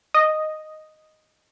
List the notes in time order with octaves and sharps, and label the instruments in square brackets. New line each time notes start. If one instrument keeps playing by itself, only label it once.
[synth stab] D#5